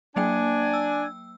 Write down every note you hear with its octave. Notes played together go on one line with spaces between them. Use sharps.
F#3 A#3 D4 G5 G#5
E6